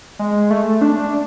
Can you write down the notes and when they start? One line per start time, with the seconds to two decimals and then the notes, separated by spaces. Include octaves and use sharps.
0.19 G#3
0.50 A3
0.81 D4